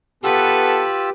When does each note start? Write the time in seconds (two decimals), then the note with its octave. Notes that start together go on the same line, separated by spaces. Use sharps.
0.24 B3 F4 G4 A4 B4 E6